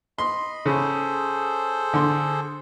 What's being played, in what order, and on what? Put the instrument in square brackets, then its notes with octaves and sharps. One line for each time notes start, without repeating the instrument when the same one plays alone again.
[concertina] D#5 B5 [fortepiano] C6
[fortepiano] C#3 [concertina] G#4 A4 C5
[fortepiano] D3 C6